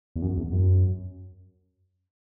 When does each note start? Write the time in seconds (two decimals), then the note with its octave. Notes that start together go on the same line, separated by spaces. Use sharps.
0.16 E2
0.22 F#2
0.37 E2
0.52 F#2